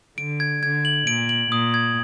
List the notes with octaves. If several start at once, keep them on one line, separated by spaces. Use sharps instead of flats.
D3 D7
G#6
D3 G#6
F#7
A#2 D7
F#7
A#2 D#6
G#6